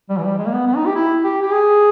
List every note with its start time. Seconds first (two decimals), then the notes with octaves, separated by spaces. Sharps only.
0.09 G3
0.17 E3
0.25 G3
0.38 G#3
0.46 A#3
0.53 B3
0.67 B3
0.76 D#4
0.85 G4
0.95 E4
1.24 G4
1.42 G4
1.52 G#4